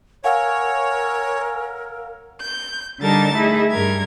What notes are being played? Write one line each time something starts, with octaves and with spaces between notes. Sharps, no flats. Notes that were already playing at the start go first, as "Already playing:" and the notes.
A#4 C#5 F5 F#5 G#5 E6
G6
D3 G3 D#4 A#4 A5 A6
A3 D#4 E4 G#4
G2 A#4 G#6